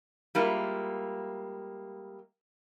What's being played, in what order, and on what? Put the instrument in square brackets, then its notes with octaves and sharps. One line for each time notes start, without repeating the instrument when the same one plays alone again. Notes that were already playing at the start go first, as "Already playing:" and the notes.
[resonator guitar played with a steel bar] G3 G#3 A#3 E4 F4